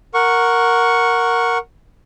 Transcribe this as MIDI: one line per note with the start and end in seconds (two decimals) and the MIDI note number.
0.14 1.58 70
0.14 1.58 78
0.14 1.58 85